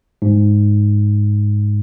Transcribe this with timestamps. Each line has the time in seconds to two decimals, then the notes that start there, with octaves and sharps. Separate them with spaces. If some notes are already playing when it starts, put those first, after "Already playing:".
0.22 G#2